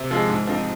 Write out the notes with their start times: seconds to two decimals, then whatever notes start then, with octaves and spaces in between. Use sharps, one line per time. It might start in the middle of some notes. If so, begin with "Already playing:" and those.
Already playing: C3
0.11 F3 G#3
0.29 G#2
0.47 F3 C4 D#4